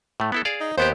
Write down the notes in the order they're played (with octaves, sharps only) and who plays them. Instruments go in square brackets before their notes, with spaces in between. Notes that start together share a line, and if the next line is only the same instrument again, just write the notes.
[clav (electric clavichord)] A2 A3
B3 E4 A4
G#4 D5 F5
[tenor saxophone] D#4
[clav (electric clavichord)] D#2 B3 G4 [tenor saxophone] C5